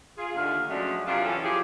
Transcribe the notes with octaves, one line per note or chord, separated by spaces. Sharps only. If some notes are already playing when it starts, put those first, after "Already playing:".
F4 G#4
D#2 D3 A3 F4 A#4
F3 F#3 G#3 A3 C#4 D4
F#2 C3 D4 F4
E3 C#4 A4
F3 G4 G#4